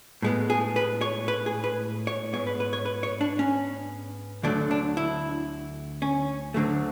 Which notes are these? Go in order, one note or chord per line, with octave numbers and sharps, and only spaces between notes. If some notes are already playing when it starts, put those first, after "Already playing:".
A2 G#3 B3
G#4
B4
C#5
B4
G#4
B4
C#5
G#2 G#3 B3 C#5
B4
B4
C#5
B4
C#5
D4
C#4
D2 D3 F#3 A3 D4
D4
E4
C#4
D2 D3 F#3 A3